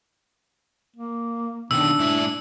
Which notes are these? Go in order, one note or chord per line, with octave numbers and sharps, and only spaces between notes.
A#3
B2 D#3 D4 E6
G#2 E4